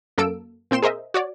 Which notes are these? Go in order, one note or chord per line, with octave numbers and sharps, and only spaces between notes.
F#2 A#3 A4 E6 D7
A#2 C4 G5 C6 E7
G#4 A#4 C5 D#5 E5
F#4 C#5 D5